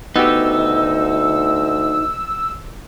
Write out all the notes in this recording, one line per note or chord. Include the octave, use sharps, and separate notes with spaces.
D2 B3 D#4 F#4 G4 E6